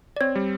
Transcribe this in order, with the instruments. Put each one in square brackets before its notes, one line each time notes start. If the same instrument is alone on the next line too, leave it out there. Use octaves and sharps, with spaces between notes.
[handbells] D5
[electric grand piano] C4 [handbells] C#5
[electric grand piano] G3